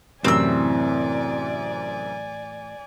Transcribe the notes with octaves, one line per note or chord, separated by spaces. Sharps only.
F#2 A2 C3 E3 C4 D5 G#5 E6